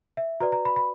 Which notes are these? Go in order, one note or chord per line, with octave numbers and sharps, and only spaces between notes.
E5
F#4 B4 D5 A#5
A#5
B5
B5